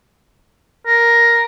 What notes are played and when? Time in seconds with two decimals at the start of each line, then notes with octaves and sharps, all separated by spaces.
0.87 A#4